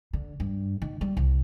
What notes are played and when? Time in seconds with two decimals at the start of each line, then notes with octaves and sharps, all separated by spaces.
0.13 D3
0.40 G2
0.82 D#3
1.01 G3
1.17 C2